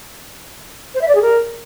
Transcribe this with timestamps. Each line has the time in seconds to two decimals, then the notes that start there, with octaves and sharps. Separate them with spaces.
0.95 C5
1.01 E5
1.08 D5
1.15 G#4
1.22 A#4